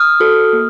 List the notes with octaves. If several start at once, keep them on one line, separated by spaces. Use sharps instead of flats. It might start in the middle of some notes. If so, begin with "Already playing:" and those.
Already playing: D#6 F6
F#4 A4
A#3